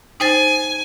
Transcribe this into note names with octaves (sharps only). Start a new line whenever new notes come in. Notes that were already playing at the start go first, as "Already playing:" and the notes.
D#4 C5 G#5 A6